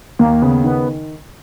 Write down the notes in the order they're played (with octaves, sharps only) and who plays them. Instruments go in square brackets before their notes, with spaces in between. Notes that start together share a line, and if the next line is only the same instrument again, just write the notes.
[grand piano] D#2 [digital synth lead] A#3
[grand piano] C#3 [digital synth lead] B3
[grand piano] D#3 [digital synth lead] B3